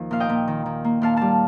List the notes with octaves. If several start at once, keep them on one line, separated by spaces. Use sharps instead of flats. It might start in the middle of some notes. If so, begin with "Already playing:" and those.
Already playing: D#2 F3
A#2 F5
D#5 G5
A#2
D#3
D#3
A#3
A#2 F5 A5
G3 F5 A5